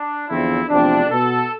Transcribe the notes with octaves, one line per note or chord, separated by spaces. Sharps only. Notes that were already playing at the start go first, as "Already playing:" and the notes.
Already playing: D4
E2 D3 F3 C4 E4
E2 C3 F3 A3 C4 D4
B2 B3 A4